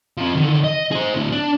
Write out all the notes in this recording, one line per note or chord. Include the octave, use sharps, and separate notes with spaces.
F3 C4
D3 D#3
D#5
G#4 C5
D2 A2
D4